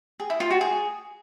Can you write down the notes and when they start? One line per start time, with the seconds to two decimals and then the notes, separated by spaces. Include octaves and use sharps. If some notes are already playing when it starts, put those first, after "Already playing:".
0.20 G#4
0.30 E4
0.40 F4
0.51 F#4
0.61 G#4